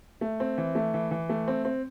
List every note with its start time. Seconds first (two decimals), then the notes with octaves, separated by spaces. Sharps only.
0.21 A3
0.40 C4
0.58 E3
0.75 A3
0.94 E3
1.11 E3
1.29 A3
1.48 C4
1.65 C4